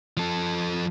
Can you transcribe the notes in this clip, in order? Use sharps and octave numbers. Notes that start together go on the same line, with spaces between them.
F3 A4